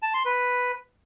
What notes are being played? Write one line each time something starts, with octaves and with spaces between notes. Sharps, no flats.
A5
C6
B4